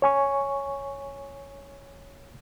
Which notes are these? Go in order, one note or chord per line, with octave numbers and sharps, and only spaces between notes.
C#5 G#5 C#6